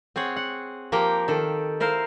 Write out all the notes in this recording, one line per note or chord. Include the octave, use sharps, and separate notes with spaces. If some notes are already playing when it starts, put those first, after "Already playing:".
C4 G#4 C#5 F#5
F#5
F3 A#3 G4 A#4 G5 A#5
D#3 A4
E4 A#4 C5 F5